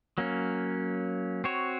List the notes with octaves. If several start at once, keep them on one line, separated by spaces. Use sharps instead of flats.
F#3 A#3 C#4
C4 F#4 C#5